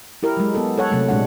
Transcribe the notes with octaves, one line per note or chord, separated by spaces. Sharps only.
E4 G4 A#4
F#3 G#3
B3 A4
A4 C#5 F#5
C3 F#3 A3
A#2 G#3 D4 F#5